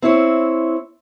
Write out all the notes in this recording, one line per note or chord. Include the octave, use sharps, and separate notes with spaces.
C4 E4 C#5